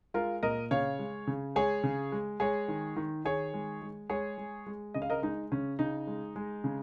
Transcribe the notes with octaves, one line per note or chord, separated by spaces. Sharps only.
G#3 F4 A#4
A#2 A#4 D#5
C#3 C#5 F5
G#3
C#3
G#3 G#4 C#5
C#3
G#3
G#3 G#4 C#5
D#3
D#3
D#3 G#4 C#5
G#3
G#3
G#3 G#4 C#5
G#3
G#3
C#3 D#5
F5
A#4 D#5
G#3 D#4
C#3 C#4
C#3 D#4
G#3
G#3
C#3